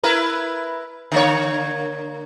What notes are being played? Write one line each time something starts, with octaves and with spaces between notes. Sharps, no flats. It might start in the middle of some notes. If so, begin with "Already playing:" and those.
E4 A#4 B4
D3 A#3 C#5